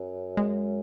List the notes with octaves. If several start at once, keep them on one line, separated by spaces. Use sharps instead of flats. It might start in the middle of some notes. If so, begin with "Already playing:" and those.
Already playing: F#2
G#3